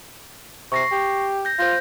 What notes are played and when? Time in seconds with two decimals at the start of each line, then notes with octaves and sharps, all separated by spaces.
0.72 C3 C#6 A#6 C7
0.91 G4
1.45 G6 A#6
1.59 F4 C5 G6 A#6